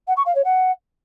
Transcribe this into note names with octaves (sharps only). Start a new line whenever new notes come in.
F#5
C#6
F5
C#5
F#5